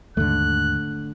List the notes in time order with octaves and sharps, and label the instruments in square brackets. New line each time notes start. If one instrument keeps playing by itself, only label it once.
[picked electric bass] D#2 G#2 [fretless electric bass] D3 A3 [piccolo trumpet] F#6